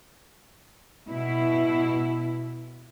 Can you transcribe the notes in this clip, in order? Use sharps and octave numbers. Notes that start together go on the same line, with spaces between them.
B2 E4